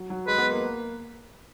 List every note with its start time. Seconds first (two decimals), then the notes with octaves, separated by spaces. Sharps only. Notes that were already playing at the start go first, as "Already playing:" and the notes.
Already playing: F#3
0.10 F#3
0.27 G#3 B4
0.38 B3
0.50 A#3